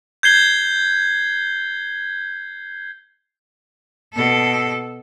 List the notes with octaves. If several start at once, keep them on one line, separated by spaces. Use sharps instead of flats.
G6 G#6 C7 G7
B2 A4